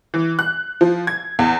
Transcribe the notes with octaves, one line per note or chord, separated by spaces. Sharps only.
E3
F#6
F3
G#6
E2